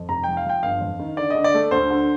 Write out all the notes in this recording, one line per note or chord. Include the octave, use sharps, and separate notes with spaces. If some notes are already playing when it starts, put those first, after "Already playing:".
Already playing: F2
F1 A#5
F3 G5
F5
F3 G5
G1 F5
F2
D#3
D3 D5
D3 D#5
D5
A3
D2 C5
D3